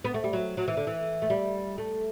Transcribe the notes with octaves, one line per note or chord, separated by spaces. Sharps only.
B3
A3
G3
F#3
F#3
E3
D3
E3
A3
G3
A3